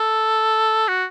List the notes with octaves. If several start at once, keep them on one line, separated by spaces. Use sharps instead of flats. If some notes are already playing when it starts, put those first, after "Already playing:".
Already playing: A4
F#4